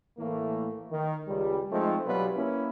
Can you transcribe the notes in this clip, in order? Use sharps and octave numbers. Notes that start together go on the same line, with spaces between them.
A2 E3 A3 A#3
D#3
C#2 G3
F3 G#3 A3 C4 D#4
B2 F#3 G3 F4 B4
A#3 C#4 E4